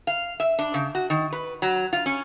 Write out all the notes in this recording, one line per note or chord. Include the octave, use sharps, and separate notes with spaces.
F5
E5
D4
C#3
F#4
D#3
B4
F#3
F4
C#4